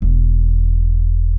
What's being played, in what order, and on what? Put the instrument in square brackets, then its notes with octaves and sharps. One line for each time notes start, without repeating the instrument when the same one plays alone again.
[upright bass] E1